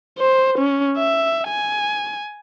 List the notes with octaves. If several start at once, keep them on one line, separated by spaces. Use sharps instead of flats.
C5
C#4
E5
G#5